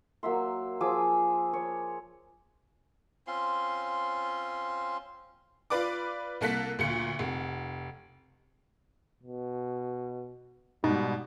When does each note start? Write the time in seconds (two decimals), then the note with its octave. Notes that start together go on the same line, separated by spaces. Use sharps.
0.23 F#3 A#3 E5 C6
0.80 F3 G#4 D6 E6
1.53 C#5
3.27 C4 C#4 F4 C6
5.70 F4 B4 D5 D6
6.41 C2 A#3 A4 F#6 B6
6.79 D2 A#2 F4 C#7
7.19 F1
9.23 B2
10.84 G#2 B2 G3 D#4